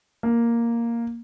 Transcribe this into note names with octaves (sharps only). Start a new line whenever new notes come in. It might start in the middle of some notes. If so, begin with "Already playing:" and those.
A#3